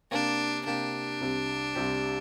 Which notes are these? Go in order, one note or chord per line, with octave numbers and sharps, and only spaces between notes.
C3 A#3 D4 G4
C3 A#3 D4 G4
C2 C3 G3 C4 G4
C2 C3 G3 C4 G4